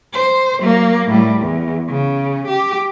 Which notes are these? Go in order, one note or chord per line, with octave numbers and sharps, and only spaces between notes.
C5
F#3 A#3
A2 G3
E2
C#3
G4